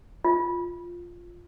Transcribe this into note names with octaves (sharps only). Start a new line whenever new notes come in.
F4